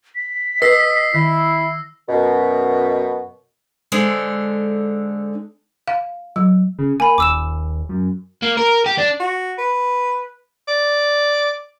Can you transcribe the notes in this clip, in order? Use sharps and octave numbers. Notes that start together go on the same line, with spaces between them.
B6
B4 D#5 E6 A#6 C7
D#3 E4
F#2 B2
D3 G#3 D4 A4 C5
F5
F#3
C#3
A#3 G#5 B5
D#1 D6 E6 E7
F#2
A#3
A#4
G4
D4
F#4
B4
D5